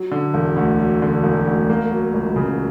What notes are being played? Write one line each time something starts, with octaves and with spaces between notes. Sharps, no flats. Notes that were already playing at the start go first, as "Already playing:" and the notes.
Already playing: F#3
D3
E1
D2
F#3
D3
E1
D2
A#3
F#3
C#2
C#3